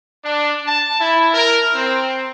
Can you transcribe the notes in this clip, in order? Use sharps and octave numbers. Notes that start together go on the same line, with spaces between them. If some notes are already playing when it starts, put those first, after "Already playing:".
D4
A5
E4
A#4
C4